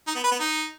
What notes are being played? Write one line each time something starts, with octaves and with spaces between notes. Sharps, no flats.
D#4
B3
B4
B3
D#4